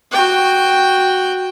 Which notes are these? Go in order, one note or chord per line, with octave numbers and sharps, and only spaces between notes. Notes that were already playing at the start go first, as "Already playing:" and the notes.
F#4 G5